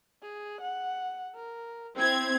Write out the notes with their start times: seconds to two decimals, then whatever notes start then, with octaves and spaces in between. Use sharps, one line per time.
0.22 G#4
0.61 F#5
1.35 A#4
1.97 C4 E4 G#6